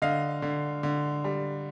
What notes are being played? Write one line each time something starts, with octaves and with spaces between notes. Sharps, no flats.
D3 D#5 F5
D3
D3
G3